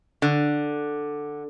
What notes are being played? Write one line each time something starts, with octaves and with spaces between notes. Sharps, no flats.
D3